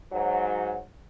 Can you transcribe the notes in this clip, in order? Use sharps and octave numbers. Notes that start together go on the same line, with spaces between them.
G#2 F#3